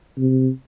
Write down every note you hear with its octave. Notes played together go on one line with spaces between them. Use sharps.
C3